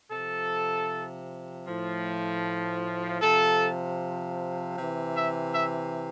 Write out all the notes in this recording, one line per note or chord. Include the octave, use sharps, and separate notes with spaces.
C3 F3 A4
A2 F3
C3 F3 A4
C3 E3
E5
E5